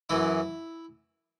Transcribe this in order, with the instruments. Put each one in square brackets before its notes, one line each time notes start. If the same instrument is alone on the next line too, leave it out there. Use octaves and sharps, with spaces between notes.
[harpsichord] F#2 E3 E4